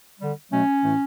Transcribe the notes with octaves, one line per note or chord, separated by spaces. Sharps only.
D3 G3
B2 F#3 A3 C#4
A2 E3 A3